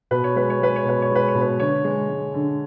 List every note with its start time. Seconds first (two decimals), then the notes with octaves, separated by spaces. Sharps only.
0.11 B2 B4
0.24 C#5
0.36 G#3 B4
0.50 C#5
0.61 G#3 B4
0.76 C#5
0.85 B2 B4
1.02 C#5
1.10 G#3
1.16 B4
1.28 C#5
1.35 B2
1.41 B4
1.59 D3 C#5
1.84 G#3
2.09 G#3
2.34 D3